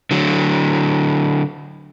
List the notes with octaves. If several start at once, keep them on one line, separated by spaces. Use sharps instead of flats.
D3 F#3